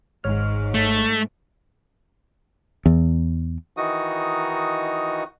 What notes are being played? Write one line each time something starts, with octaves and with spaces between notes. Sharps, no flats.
G#1 G#2 C#5 F6
A3
E2
D#3 E3 D#4 F#4 D#6